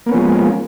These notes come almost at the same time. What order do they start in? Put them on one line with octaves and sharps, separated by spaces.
A#3 B3 C#4 F3 G#3